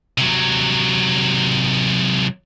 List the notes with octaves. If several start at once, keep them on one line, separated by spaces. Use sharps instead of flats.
C3 F#3